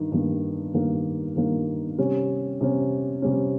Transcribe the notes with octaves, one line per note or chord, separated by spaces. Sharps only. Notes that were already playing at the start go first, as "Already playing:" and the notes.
Already playing: G2 D#3
G2 D#3 A#3
G2 D#3 A#3
G2 D#3 A#3
C3 G3 C#4
C3 G3 C#4
C3 G3 C#4